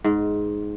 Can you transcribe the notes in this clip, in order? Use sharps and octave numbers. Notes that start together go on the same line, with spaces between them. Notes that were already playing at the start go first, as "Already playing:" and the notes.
G#2